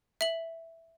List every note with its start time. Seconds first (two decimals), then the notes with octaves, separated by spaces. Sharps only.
0.21 E5 F#7